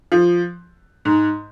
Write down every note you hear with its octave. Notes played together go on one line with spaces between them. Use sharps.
F3
G#2